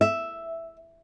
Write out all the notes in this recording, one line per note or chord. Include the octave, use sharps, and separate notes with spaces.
E5